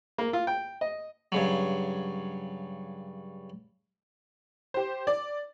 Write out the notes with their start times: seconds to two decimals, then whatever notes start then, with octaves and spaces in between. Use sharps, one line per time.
0.18 A#3
0.33 F4
0.47 G5
0.81 D#5
1.32 G2 C#3 F#3
4.74 G4 C5
5.07 D5